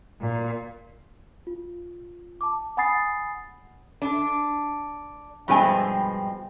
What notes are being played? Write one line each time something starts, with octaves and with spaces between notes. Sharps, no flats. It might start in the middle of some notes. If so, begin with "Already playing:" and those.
A#2
F4
A5 D6
F#5 G#5 B5 D#6 A6 C7
D4
G2 B2 F3 G#3 C4 G#5